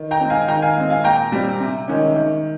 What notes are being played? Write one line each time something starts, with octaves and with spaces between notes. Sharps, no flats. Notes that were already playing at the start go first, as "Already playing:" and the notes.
Already playing: D#3
G5 A#5
G#3 C4
F5 G#5
D#3 G5 A#5
F5 G#5
G#3 C4
F5 G#5
A#2 G5 A#5
G3 C4
C3
D#3 G#3 C#4
D#3